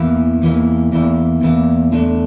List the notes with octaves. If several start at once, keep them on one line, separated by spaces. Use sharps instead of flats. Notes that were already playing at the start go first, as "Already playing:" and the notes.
Already playing: E2 E3 A#3 E4
E2 E3 A#3 E4
E2 E3 A#3 E4
E2 E3 A#3 E4
E2 D3 A3 D4